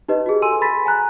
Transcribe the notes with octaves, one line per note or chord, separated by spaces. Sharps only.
D#4 G4 B4 D#5
F#4 G#4
A4 G#5 C6 E6 D#7
B5 C6 A6 B6
G#5 A#5 F#6